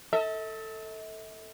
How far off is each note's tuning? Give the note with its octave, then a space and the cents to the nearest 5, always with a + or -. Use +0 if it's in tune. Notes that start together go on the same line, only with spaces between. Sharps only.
A4 +15 E5 -45